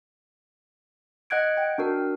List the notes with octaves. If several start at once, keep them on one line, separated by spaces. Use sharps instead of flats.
D#5 F#5 F#6 G#6 D7
G5
D4 F#4 A#4